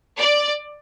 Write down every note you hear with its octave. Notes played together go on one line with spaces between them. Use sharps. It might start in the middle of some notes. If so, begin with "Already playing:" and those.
D5